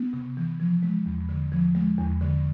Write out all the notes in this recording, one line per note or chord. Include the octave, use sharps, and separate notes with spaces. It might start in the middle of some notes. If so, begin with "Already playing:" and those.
Already playing: B3
C3
E3
F3
G#3
E2
D3
F3
G#3
E2
D3